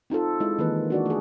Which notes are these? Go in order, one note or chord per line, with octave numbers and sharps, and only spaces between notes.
C4 D#4 F4 A4
G#3 D#4 E4
D#3 E3 A#3 C4 D#4 B4
D4 F#4 D5
A3 G#4